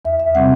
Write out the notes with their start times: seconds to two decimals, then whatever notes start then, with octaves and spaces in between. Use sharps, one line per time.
0.05 E2 E5
0.19 E5
0.35 C3 G3 C4 F#5